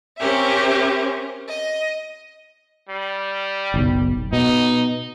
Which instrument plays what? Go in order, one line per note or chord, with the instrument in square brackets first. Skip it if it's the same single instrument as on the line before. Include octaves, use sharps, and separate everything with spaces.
[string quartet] C4 C#4 G4 A#4 E5
D#5
[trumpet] G3
[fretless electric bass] F#1 B1
[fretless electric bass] B2 [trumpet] D#4